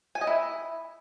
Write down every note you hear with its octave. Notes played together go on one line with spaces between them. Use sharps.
G#5
D#5
E4